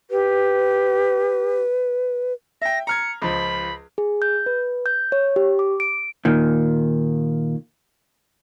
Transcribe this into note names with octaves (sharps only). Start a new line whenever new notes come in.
G4 B4
E5 G5 A#6
A#5 F6 G#6 C#7
C#2 F3 B5
G#4
G6
B4
G6
C#5
G4
D6
D7
A#2 D#3